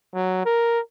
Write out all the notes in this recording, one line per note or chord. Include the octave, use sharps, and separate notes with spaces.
F#3
A#4